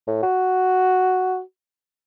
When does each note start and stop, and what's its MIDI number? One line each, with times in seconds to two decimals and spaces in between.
0.07 0.19 45
0.23 1.40 66